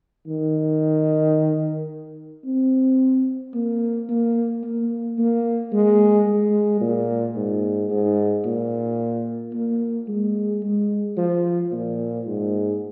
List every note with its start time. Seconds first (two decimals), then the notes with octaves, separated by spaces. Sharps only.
0.27 D#3
2.45 C4
3.54 A#3
4.09 A#3
4.64 A#3
5.18 A#3
5.72 G#3
6.27 G#3
6.81 A#2
7.36 G#2
7.90 G#2
8.45 A#2
9.53 A#3
10.08 G#3
10.63 G#3
11.17 F3
11.72 A#2
12.27 G#2